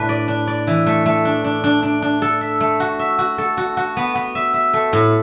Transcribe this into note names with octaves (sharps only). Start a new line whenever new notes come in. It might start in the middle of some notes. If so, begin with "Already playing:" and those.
Already playing: A2 A3 D4 B4
D5
D4
D5
E3
A3
A3
D4
D4
D4
D4
D4
A4
E5
A3
F#4
E5
F#4
A4
F#4
F#4
B3
B3
E5
E5
A3
A2